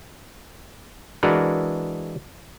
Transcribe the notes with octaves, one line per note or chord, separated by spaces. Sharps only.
E3 G#3 D4 F#4 A#4 B4